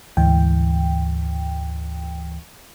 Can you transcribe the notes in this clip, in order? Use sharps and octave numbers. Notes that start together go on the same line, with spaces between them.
D2 G#2 E3 G5